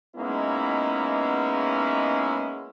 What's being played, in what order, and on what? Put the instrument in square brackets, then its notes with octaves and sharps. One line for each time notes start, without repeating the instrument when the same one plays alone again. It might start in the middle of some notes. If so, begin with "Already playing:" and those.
[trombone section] G#3 A#3 B3 C#4 D#4 E4